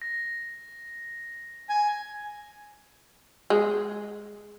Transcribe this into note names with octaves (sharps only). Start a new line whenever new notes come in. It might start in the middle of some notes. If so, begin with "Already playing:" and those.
A#6
G#5
G#3